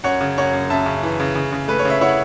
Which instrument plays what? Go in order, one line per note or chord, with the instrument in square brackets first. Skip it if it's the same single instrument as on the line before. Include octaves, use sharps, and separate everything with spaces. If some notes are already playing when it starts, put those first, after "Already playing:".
[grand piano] F#2 C#5 F#5
C#3
F#2 C#5 F#5
F#2
F#2 E5 A5
C#3
E3
C#3
C#3
C#3
A3 B4
C#5
C#3 E5
E4 C#5 F#5